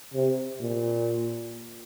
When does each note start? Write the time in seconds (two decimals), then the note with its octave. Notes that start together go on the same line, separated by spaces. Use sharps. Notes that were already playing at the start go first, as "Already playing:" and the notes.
0.14 C3
0.61 A#2